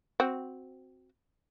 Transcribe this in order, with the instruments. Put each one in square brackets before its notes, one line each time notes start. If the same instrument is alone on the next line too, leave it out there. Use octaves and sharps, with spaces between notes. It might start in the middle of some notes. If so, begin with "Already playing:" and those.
[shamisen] C4 F#4